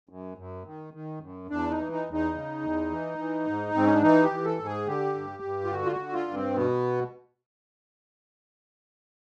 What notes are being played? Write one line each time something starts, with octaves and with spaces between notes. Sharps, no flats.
F#2
F#2
D#3
D#3
F#2
E2 D4
D#4
E3
D#4
E2
D#4
C#3
E2
E3
E3
G#2
G#2 C4
C#4
D4
E3 D#4
G4
E3
A4
G#2
G#4
D3 G4
G2
G2
F4
D3 F#4
F4
F#4
D3
F4
G2
C4
B2 B3